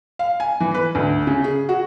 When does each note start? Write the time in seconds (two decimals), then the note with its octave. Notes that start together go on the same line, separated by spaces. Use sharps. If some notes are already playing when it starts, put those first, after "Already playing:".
0.19 F5
0.40 G#5
0.60 E3
0.74 B4
0.95 D2
1.27 C#3
1.44 G#4
1.69 F#4